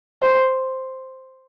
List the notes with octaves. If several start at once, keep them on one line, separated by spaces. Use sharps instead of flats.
C5